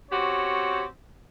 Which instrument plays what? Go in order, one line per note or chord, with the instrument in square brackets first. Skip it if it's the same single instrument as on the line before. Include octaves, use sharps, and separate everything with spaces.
[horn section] C4 C#4 F#4 G4 C#5